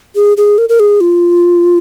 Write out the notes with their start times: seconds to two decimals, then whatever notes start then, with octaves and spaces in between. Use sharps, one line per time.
0.16 G#4
0.37 G#4
0.58 A#4
0.69 A#4
0.80 G#4
1.01 F4